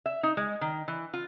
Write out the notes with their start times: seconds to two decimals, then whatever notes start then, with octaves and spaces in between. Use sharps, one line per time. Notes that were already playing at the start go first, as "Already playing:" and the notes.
0.06 E5
0.23 D#4
0.37 G#3
0.61 D#3
0.88 E3
1.14 F4